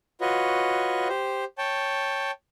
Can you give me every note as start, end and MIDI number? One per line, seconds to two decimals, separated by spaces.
0.21 1.08 65
0.21 1.08 66
0.21 1.08 71
0.21 1.08 73
0.21 1.08 75
1.09 1.44 67
1.09 1.44 72
1.58 2.31 73
1.58 2.31 79
1.58 2.31 81